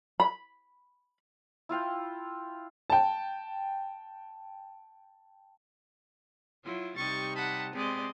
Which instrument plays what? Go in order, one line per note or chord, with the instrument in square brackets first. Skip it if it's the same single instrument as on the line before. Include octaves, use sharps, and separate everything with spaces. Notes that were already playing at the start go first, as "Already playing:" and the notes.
[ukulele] B5
[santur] E4 F4 F5 G5
[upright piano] G5 A5
[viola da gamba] F#3 E4 F4
[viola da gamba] C3 G3 D#4 [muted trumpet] C#6 [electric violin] A6
[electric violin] F#5 A5 [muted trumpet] B5
[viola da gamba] G#3 D5 D#5 [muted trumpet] B3 [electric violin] C4